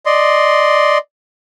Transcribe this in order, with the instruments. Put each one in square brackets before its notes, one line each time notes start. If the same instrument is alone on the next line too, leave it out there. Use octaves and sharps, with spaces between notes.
[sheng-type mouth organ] D5 D#5 C6